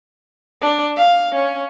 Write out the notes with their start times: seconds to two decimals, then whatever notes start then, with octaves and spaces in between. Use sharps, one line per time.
0.62 D4
0.96 F5
1.35 C#4